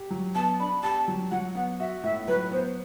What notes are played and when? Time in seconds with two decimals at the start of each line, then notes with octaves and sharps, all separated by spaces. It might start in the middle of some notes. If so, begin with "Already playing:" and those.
Already playing: G4
0.11 F#3
0.35 B3 A5
0.60 D4 B5
0.83 G4 A5
1.08 F#3
1.31 F#3 F#5
1.55 B3 F#5
1.80 F#4 E5
2.03 A2 E5
2.28 F#3 B4
2.52 B3 C5